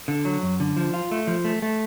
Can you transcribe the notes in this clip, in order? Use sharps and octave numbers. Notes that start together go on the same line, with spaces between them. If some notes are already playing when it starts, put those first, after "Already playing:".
D3
F#3
F#2
D3
F3
F4
A3
F3
A3
A3